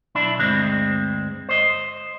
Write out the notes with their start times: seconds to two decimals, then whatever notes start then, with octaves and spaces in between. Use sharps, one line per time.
0.15 B1 D4 E4
0.38 D2 G2 G#3 C4
1.49 C5 D#5